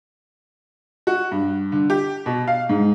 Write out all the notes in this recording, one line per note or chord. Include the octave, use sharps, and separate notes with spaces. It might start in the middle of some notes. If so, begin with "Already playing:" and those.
F#4
G2
D3
G4
B2
F5
G#2